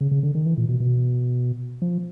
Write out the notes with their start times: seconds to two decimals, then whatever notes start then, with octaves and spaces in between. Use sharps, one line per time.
0.01 C#3
0.11 C#3
0.23 D3
0.35 D#3
0.46 E3
0.57 A#2
0.69 B2
0.80 B2
1.82 F3